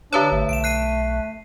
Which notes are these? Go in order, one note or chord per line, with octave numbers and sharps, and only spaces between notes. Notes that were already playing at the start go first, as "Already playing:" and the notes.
D3 D4 B4 C#5
G#1 A3
B1 D7 E7
F#6 C7 D#7